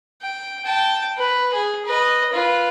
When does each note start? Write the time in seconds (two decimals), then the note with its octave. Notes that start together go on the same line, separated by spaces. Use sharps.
0.22 G5
0.65 G5 A5
1.18 B4
1.53 G#4
1.86 B4 D#5
2.33 F4 B4